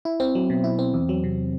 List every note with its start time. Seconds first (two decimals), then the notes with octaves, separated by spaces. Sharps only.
0.05 E4
0.20 C4
0.35 F#3
0.50 B2
0.64 E4
0.79 C4
0.94 E2
1.09 F#3
1.24 C3